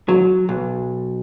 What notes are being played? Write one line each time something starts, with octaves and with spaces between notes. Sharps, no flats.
F#3
B1